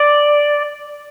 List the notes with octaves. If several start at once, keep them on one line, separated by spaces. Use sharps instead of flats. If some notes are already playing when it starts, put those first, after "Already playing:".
Already playing: D5